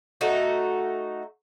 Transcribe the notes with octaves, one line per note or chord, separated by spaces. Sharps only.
A3 D#4 F#4